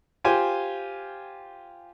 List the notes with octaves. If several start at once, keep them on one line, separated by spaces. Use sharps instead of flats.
F4 G4 C5 G#5